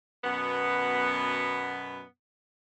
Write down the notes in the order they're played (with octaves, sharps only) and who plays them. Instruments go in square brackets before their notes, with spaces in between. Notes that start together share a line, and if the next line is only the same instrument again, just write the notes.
[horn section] F#2 B2 B3